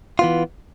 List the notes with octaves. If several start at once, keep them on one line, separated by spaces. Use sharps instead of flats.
E3 B3 F4